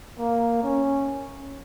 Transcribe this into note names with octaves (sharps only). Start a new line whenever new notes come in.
A#3
C#4